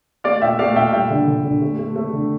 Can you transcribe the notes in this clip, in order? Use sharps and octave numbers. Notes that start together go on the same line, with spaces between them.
A3 D5 F5
A#2 E5 G5
A3 D5 F5
A#2 E5 G5
G3 E5 G5
D3
D3
D3
A3
A3
A3
D3